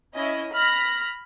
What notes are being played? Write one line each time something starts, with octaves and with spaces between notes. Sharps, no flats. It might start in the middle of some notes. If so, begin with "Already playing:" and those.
C#4 E4 D#5
B5 F6 A#6